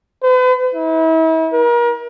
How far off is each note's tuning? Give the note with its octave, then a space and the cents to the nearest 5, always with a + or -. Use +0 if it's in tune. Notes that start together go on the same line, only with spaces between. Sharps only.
B4 +45
E4 -40
A#4 +35